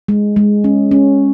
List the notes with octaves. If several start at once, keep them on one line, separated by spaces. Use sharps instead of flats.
G#3
G#3
C#4
C#4